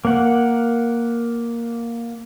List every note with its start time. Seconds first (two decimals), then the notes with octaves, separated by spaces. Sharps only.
0.05 A#3 F#5